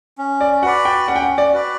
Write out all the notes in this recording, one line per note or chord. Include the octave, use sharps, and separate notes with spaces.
C#4
D5
F#4 B4 D5 F#5
G5
C#4 F#5
G5
F#5
D5
F#4 B4 D5